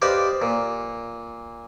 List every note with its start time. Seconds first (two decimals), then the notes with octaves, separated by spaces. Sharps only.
0.02 G4 B4 C5 D5 D#5 F5
0.42 A#2